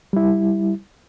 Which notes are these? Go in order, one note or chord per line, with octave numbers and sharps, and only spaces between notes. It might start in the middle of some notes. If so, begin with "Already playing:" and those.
G3 E4